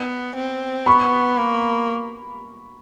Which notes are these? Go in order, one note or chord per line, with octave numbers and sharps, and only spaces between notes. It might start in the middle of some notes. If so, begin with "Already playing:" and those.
Already playing: B3
C4
B3 B5 C#6
A#3